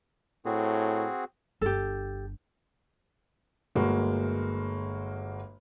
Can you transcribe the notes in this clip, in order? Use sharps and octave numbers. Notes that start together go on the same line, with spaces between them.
A2 C4 F#4 G#4
G1 G4 A4
G1 G#3 A#3 F#4